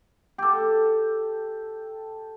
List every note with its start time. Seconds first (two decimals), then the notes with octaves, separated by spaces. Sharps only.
0.38 G4 A4